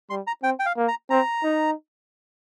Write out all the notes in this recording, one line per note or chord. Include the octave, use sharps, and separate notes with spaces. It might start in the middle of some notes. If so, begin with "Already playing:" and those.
G3 C6
A#5
C4 G5
G5
F5
A#3
A#5
C4 A#5
D#4